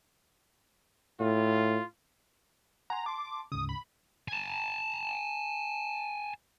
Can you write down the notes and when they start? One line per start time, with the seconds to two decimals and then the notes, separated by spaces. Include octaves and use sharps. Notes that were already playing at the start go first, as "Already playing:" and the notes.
1.20 A2 F4
2.90 F#5 G#5 A#5 C6
3.06 A5 C6 D6
3.52 D2 G#2 C#3 D#6
3.69 B5
4.28 G#5 A5